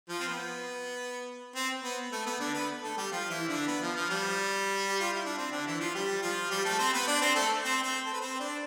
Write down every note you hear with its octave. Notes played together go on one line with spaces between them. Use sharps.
F3 F4
C4
B3
C4
B3
A3
B3
D3 D4
B3 B4
A3 A4
G3 G4
F3 F4
E3 E4
D3 D4
B3
F3
F3
G3
G4
F4
E4
D4
C4
D3 D4
E3 E4
F3 F4
G3 G4
F3 F4
G3 G4
A3 A4
C4 C5
B3 B4
D4 D5
C4 C5
A3 A4
C4 C5
C4 C5
A4
B4
C4 C5
D4 D5